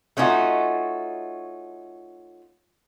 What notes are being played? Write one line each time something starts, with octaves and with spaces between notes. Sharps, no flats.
A3 C#4 D#4 F4 F#4